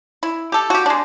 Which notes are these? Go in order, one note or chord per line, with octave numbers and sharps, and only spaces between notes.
E4
G4 A4
F#4 G4
G#3 D4